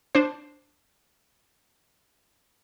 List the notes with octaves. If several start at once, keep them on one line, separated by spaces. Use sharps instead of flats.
D4 C5